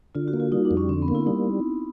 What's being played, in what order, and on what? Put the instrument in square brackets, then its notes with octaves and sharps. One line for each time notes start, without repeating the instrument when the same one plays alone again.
[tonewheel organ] D3 [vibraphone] F4
[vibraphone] F#4
[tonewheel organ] A#3
[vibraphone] F4
[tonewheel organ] G3 [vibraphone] D#4
[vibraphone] D4
[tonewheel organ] F2
[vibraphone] C#4
[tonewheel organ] D3 [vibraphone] C4
[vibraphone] B3
[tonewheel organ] A#3
[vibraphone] E4
[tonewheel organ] G3 [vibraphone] D#4